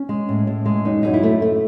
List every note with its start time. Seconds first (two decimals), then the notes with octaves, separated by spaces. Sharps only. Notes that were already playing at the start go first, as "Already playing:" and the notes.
Already playing: C#4
0.09 G#3
0.29 A2
0.47 A2
0.66 G#3
0.85 F#2 D#4
1.03 F#2 D#4
1.14 E4
1.23 A3
1.42 A3